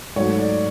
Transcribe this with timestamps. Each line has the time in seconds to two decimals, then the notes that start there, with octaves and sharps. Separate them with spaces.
0.16 G#2 F#3 A3 C#5
0.38 D5